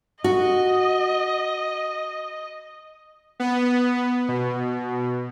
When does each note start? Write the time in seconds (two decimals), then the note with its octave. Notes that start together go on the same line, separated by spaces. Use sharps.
0.24 F#4 D#5
3.40 B3
4.28 B2